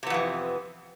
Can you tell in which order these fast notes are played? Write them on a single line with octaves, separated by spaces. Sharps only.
C3 B3 F2 E3